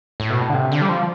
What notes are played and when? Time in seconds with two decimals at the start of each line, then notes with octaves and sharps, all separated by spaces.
0.20 A2
0.30 B2
0.41 A2
0.49 D3
0.54 C3
0.72 D3
0.82 G3
0.89 F3